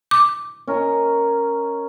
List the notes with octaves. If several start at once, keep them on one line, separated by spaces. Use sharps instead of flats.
D6
C#4 A#4 D#5